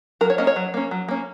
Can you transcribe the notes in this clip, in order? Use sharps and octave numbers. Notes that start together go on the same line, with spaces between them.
F#3 A#4
C#5
A#3 C#4 D#5
C#5
F#3
A#3 C#4
F#3
A#3 C#4